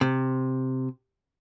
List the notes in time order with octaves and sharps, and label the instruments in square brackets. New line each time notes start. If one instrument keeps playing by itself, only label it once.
[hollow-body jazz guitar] C3